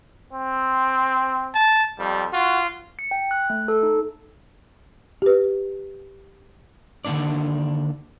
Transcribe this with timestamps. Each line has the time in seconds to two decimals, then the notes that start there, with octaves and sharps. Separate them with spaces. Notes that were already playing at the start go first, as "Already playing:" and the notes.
0.33 C4
1.55 A5
1.99 F2 G3
2.33 F4 F#4
2.99 C#7
3.11 G5
3.31 F#6
3.50 A3
3.68 A4
3.83 D#4
5.22 G4 B4
7.05 D3 D#3 A#3 D4 D5